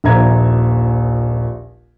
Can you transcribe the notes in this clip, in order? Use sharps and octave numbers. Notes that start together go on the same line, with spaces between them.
D#1 A#1 E5 A#5 G#6